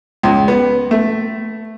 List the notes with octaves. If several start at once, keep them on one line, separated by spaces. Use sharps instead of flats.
C#2
B3
A3